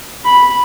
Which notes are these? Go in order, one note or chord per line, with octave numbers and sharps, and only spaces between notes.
B5